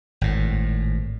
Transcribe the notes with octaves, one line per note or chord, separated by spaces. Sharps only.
G#1 A2